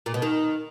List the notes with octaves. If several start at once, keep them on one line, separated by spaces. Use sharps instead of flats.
A#2
B2
D#3